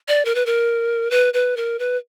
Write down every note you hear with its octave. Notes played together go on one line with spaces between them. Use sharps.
D5
A#4
B4
A#4
B4
B4
A#4
B4